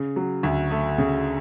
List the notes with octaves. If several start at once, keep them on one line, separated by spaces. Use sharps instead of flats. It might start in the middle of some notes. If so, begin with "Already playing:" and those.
Already playing: C#3
F#3
D2
A3
C#3